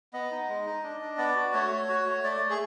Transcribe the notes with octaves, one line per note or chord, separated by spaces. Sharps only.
B3 D#5
D#4
G#3
D#4
D4
D4
B3 D5
F#4
A3 C#5
A3
F#4
A3
A3 D5
A3
G#4